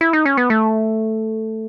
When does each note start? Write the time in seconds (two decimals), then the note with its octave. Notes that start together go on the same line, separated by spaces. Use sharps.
0.01 E4
0.13 D#4
0.25 C#4
0.37 B3
0.50 A3